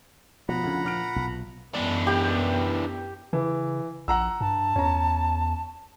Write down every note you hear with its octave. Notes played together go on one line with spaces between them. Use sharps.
B2 F3 F#5 A#5 B5
D2 C#3
A#2 F6 D7
B1
F#2 E3 B3 D4
G4 G5
C#3 E3
A#1 F#5 A#5 E6
G2 A5
E2 C#4 A#5